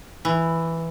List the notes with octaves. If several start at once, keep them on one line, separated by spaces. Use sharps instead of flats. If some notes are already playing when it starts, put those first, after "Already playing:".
E3